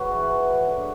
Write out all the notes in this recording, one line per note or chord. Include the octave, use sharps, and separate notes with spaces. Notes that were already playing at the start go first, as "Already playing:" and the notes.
Already playing: G#2 F#4 B4 C#5
E3
E3
F#3
D3